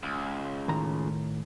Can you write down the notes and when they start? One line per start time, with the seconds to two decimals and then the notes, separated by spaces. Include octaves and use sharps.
0.03 C#2
0.68 A2 D#3 A#5